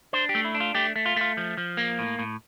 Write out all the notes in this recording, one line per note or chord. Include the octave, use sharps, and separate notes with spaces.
D4 C5
G4
A3
E4
D4
F4
A3 G4
A3
F4
A3 F4
F3
F3
A#3
A2
A2